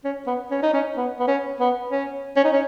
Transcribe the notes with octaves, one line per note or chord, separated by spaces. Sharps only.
C#4
B3
C#4
D#4
C#4
B3
B3
C#4
B3
C#4
C#4
D#4
C#4